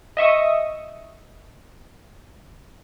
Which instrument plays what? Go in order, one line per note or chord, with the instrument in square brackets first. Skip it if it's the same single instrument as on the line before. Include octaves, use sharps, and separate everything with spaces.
[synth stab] D#5 E5 C#6 D#6